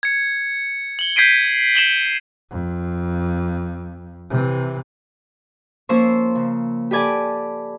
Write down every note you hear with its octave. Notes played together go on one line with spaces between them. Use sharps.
G#6 C#7
F#7 G7
G6 G#6 B6 C7 D7 D#7
B6 E7 F#7 G7
F2
C3 E3
F3 A#3 C#4 C5 C#6 E6
C#3
G4 A4 B4 D5 G#5 A5